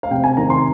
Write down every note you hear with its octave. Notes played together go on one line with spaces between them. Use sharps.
F5
C3 G5
G#5
D#3 A#5
C6